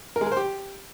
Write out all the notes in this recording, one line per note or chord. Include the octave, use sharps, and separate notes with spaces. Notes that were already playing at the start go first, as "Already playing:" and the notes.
A#4
G#3
A#4
C5
G4